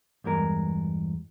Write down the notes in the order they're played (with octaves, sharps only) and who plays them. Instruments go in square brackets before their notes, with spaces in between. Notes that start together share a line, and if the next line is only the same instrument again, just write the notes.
[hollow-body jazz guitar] E2 G2 G#3 A#4